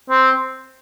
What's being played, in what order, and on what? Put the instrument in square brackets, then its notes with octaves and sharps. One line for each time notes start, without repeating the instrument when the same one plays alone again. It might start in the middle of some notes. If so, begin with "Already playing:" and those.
[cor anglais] C4